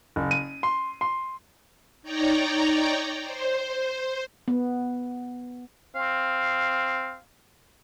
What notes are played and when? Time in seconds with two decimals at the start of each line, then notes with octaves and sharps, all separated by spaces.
0.16 F#1
0.31 D#7
0.63 C6
1.01 C6
2.02 D#4 C#5 D5 G5 A#5
3.23 C5
4.48 B3
5.95 C4 F5